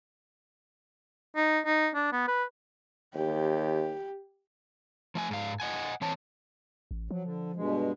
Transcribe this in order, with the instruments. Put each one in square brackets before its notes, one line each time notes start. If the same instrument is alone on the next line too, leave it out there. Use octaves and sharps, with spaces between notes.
[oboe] D#4
D#4
D4
B3
B4
[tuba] D#2 [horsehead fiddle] G4
[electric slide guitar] F3 A3 G#5
G#2 F5
D#5 F#5 G#5
E3 C4 C#5 A5
[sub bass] A1
[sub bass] F3 [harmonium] F#3
[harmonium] D3
G2 B2 G#3